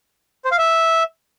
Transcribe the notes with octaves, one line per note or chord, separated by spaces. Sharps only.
C5
F5
E5